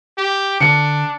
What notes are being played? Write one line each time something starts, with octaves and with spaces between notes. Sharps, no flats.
G4
D3 D4 C#7